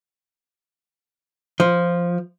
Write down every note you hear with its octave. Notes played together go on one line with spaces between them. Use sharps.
F3